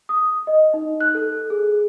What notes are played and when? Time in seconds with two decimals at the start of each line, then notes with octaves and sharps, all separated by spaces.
0.09 D#6
0.47 D#5
0.74 D#4
1.01 F#6
1.15 A4
1.50 G#4